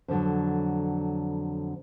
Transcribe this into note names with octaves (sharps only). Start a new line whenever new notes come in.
F2 D3 F#3